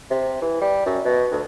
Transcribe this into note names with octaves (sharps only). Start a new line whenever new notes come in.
C3
E3
G3
F#2
B2
D2